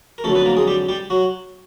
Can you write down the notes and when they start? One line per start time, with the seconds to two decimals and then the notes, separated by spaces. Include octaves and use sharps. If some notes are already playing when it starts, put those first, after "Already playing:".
0.18 A#4
0.24 F2 D3 F#3 A3 A4
0.35 B3 B4
0.45 A#3 A#4
0.57 G#3 G#4
0.67 G3 G4
0.89 G3 G4
1.10 F#3 F#4